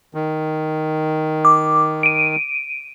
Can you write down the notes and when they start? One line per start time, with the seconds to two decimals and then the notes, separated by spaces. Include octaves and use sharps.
0.14 D#3
1.45 D6
2.03 D7 D#7